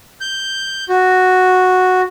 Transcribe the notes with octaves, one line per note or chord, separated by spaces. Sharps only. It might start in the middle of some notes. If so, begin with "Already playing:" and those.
G6
F#4